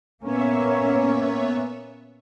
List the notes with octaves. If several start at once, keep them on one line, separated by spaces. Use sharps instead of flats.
A#2 A#3 B3 C#4 C#5 E5